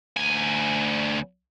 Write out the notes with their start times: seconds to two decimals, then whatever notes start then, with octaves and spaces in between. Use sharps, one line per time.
0.17 D2 G#5